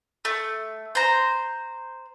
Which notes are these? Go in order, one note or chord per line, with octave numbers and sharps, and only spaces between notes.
A3
C5 A#5